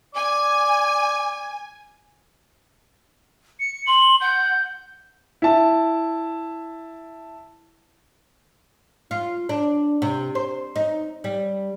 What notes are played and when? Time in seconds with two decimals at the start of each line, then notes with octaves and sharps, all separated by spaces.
0.15 D5 G#5
3.59 C#7
3.87 C6 F#7
4.21 F#5 G6
5.42 E4 A5
9.11 F4
9.49 D4
10.02 C3
10.35 C5
10.76 D#4
11.24 G3